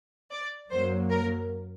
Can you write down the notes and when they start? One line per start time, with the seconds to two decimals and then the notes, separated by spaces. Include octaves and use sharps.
0.32 D5
0.70 F#2 F#3 A#3 C5
1.10 A#4